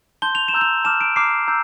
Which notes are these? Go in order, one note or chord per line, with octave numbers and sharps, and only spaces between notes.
A5 C6 G6 G7
F7
E7
A#5 E6 G6
F7
A5 D6 F6 E7
D7
A#5 D6 F6 C7
A#5 E6 G6